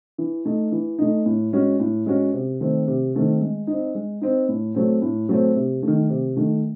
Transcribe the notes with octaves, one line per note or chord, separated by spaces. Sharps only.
E3
A3 D#4
E3
A3 D#4
A2
G#3 C#4 F#4
A2
G#3 C#4 F#4
C3
D#3 A3 C4
C3
D#3 A3 C4
G#3
C4 D#4
G#3
C4 D#4
A2
F#3 A3 C4
A2
F#3 A3 C4
C3
D#3 A3
C3
D#3 A3